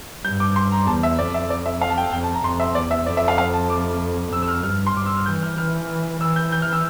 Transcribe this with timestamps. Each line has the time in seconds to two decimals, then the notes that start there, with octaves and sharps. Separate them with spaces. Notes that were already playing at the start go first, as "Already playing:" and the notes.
0.25 G2 G6
0.40 D6
0.56 C6
0.72 A#5
0.87 E2 A5
1.03 E5
1.19 F2 D5
1.34 E5
1.50 D5
1.66 E5
1.81 F5
1.90 A5
1.98 G5
2.13 F2 G5
2.24 A5
2.34 A#5
2.44 F2 C6
2.60 E5
2.75 E2 D5
2.91 E5
3.06 F2 D5
3.17 E5
3.28 F5
3.38 F5
3.53 A5
3.70 D6
4.32 F2 E6
4.42 E6
4.48 F6
4.63 G2 F6
4.87 C6
4.95 G2 D6
5.06 E6
5.16 F6
5.26 E3 G6
5.42 F6
5.58 E3 F6
6.21 E3 E6
6.36 G6
6.52 G6
6.62 F6
6.73 E6